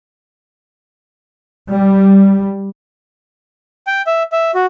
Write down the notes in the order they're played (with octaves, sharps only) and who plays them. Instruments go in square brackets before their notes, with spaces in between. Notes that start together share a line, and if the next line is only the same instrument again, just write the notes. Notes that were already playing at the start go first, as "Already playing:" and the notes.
[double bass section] G3
[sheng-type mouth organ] G5
E5
E5
F#4